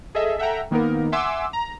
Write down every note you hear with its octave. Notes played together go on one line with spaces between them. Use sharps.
G#4 A4 D#5 E5
A4 E5 F#5 G5 A#5
D#3 A#3 B3 D#4 A#4
E5 F#5 G#5 C6 D6 E6
A#5